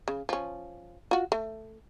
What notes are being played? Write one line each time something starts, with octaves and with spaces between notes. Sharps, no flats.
C#3
F3 C#4
F4 F#4
A3